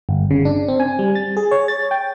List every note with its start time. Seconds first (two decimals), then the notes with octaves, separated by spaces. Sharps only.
0.09 G1
0.31 C#3
0.45 D4
0.68 C4
0.80 G#5
0.99 G3
1.15 A6
1.37 G#4
1.51 C#5
1.68 A6
1.91 G5